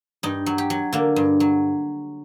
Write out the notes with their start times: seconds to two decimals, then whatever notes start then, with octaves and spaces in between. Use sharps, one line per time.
0.23 G2 D#4
0.46 F#3
0.58 G4
0.70 F#3
0.93 D3 A#3
1.16 G2
1.40 F#3